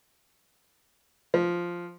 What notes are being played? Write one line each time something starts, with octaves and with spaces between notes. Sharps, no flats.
F3